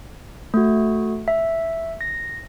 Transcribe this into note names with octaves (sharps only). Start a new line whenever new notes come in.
A3 F#4
E5
A#6